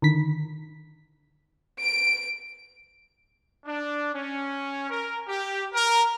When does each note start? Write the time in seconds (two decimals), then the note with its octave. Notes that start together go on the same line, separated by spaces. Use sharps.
0.02 D3 D#3 B6
1.80 D7
3.66 D4
4.14 C#4
4.90 A#4
5.28 G4
5.73 A#4